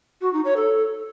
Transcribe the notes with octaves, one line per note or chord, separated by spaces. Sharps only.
F#4
D#4
C#5
A4